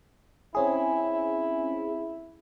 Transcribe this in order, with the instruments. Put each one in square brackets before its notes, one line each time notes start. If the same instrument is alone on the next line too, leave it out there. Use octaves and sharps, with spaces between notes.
[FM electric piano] C4 C#4 G#4 [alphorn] E4